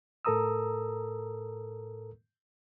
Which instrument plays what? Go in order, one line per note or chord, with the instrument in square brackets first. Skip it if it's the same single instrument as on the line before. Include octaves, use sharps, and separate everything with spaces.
[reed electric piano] A2 A4 A#4 A#5 D#6 E6